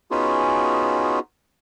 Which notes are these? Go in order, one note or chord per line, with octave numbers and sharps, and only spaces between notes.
B3 C#4 D#4 F4 F#4 G#4